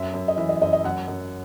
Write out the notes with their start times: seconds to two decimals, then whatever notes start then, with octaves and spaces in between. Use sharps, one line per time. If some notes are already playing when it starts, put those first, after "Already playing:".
Already playing: F#2 E5
0.14 F#2
0.28 D#5
0.37 E3 E5
0.49 D#5
0.62 F#2 D#5
0.73 D#5
0.84 F#2 F#5
1.08 F#2